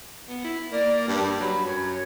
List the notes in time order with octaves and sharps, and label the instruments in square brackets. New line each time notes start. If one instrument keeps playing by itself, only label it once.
[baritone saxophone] B3
E4
[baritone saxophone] A#3 [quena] D5
[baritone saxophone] G2
[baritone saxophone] F#3 [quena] B5
[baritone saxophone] F#2 [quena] C#5